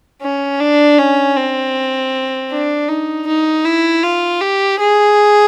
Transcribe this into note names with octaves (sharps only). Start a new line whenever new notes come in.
C#4
D4
C#4
C4
D4
D#4
D#4
E4
F4
G4
G#4